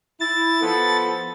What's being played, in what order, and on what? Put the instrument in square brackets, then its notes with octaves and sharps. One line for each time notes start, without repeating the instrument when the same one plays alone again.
[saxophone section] E4 [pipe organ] A6
[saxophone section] F3 B3 A4